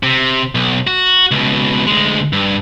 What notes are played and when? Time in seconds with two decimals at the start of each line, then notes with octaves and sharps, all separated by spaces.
0.03 C3
0.55 B1
0.87 F#4
1.31 C#2 B2
1.87 D2 G#3
2.33 G2